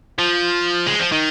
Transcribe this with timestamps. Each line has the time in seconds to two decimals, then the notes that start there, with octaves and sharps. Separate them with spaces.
0.18 F3
0.87 G#3
1.00 F3
1.12 D#3